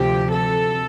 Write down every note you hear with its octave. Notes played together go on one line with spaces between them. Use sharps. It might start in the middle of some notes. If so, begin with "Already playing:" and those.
Already playing: D2 C3 F3 G4
A4